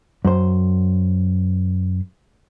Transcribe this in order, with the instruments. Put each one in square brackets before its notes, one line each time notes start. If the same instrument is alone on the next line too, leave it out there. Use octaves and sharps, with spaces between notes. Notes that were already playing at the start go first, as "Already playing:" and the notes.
[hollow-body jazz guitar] F#2 C5